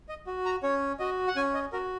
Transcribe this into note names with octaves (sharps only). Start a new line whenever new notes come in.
D#5
F#4
A#5
C#4 C#5
F#4 D#5
F#5
C#4 G#5
D#5
F#4 A#4